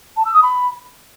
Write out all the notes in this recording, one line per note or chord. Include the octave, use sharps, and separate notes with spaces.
A5
E6
D#6
B5